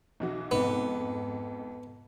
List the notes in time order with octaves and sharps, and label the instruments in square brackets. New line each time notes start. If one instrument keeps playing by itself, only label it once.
[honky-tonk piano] B1 E3 F#4
[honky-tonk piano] F2 G#2 [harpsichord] B3